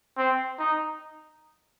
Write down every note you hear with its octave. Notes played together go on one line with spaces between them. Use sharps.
C4
D#4